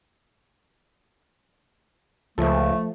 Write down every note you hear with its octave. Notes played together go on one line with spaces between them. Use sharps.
C#2 F3 A3 A4